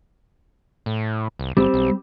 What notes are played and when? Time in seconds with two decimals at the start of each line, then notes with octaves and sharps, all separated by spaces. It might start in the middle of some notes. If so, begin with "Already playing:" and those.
0.86 A2
1.39 C2
1.57 G1 G3 C4
1.74 B1